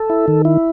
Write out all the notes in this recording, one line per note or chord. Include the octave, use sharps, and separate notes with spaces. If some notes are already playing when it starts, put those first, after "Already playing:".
Already playing: A4
E4
D#3
E4